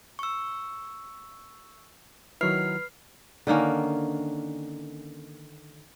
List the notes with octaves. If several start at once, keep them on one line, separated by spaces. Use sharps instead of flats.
C#6 E6
D#3 F#3 E4 B4 F6 C7
D3 D#3 A#3 C#4